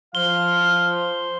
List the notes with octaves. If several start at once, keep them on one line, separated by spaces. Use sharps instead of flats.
F3 C5 F5 G7